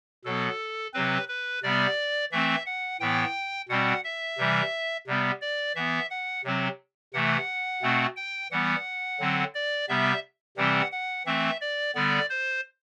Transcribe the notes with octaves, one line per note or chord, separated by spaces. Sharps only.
B2 F#3 B3 A4
C3 F#3 C4 B4
B4
C3 G3 B3 D5
E3 A3 C4 E5
F#5
A2 E3 B3 G5
B2 G3 C4 F#5
E5
C3 E3 G3
C3 G3 B3
D5
E3 B3 E5
F#5
C3 F#3 C4
C3 E3 A3 F#5
B2 A3 C4
G5
E3 G3 B3 F#5
D3 F#3 C4
D5
C3 G3 B3 E5
C3 E3 G3 C4 F#5
F#5
E3 A3 C4 E5
D5
D3 G3 B3 D5
C5